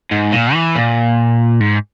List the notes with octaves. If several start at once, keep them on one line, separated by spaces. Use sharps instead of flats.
G#2
A#2
E3
A#2
G#2